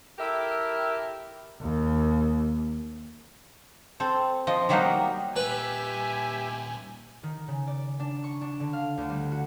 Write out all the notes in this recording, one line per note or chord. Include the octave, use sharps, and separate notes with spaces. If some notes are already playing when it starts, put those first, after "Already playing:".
E4 G4 A4 A#4 E5
D#2
C4 A4
F3 D#5
D#3 F#3 G3 A#3 B3 D#4
A#2 G3 G4 B4 E5 G#5
D#3
C#3
D5
D4
C#6
D4
D3
F5
D2
G3
F#4